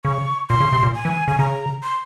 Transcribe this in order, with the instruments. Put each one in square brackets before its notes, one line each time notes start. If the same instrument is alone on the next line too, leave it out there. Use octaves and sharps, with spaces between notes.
[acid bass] C#3 [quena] C#6
[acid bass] A#2 [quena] C6
[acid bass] C#3
C3
A#2
[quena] G#5
[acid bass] E3
[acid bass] C#3 [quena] G#5
[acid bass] C#3 [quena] A#5
[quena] C6